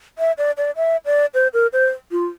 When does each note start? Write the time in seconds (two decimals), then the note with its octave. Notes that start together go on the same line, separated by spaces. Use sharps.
0.18 E5
0.38 D5
0.57 D5
0.76 E5
1.06 D5
1.34 C5
1.54 A#4
1.73 C5
2.11 F4